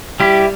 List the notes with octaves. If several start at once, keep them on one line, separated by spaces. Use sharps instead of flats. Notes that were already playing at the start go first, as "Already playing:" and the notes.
G3 E4 G4